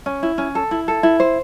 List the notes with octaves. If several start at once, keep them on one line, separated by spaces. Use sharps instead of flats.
C#4
E4
C#4
A4
E4
A4
E4
C5